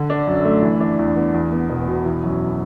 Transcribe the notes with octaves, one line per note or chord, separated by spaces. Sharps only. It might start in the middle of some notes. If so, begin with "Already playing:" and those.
Already playing: D3
D4
F#2
A3
E3
D4
E2
B3
E2
B3
E1
B2
E3
F#2